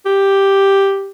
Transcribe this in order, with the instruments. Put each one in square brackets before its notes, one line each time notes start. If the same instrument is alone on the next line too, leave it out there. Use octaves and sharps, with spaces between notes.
[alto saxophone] G4